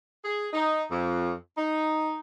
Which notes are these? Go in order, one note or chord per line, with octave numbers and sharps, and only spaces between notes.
G#4
D#4
F2
D#4